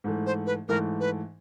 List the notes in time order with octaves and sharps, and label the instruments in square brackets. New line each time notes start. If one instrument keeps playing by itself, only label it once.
[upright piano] G#2 E3 A3
[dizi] C5
B4
[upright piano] G#2 E3 A3 [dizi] A#4
[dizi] B4